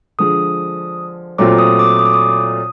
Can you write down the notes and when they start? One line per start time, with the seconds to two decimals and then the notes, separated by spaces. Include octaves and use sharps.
0.19 D3 F3 G#3 D#6
1.38 A#2 F#3 A3 C4 F4 D6
1.59 D#6
1.79 D6
1.99 D#6
2.06 D6
2.13 D#6